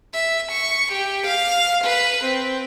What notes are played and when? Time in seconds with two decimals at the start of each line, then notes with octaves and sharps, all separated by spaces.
0.14 E5
0.52 C#6
0.92 G4
1.26 F5
1.84 B4
2.24 C4